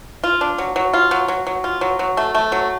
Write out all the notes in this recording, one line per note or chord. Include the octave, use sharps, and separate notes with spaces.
F4
D4
F#3
F#3
F4
F#3
F#3
F#3
F4
F#3
F#3
A3
A3
F#3